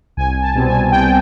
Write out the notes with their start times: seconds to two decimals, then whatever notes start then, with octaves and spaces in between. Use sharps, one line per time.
0.17 C2 G#5
0.42 A5
0.54 B2 G3 C4
0.68 G#5
0.91 C2 G5